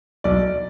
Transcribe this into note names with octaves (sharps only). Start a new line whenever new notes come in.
B1 D5